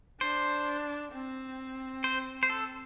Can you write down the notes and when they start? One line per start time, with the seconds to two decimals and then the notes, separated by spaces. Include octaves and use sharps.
0.21 D4 C5
1.13 C4
2.04 C5
2.43 C5
2.50 A4